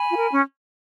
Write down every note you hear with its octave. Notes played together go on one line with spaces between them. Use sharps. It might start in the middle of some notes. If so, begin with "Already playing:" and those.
Already playing: G#5 B5
F4
A#4
C#4